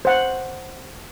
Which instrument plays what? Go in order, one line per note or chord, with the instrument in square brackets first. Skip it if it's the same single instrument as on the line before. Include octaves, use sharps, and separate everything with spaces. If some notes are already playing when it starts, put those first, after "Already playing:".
[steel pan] C5 F#5